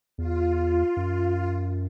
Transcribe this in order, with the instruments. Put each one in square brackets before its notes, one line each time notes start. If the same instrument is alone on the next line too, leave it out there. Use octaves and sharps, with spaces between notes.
[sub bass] E2 [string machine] F4
[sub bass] F#2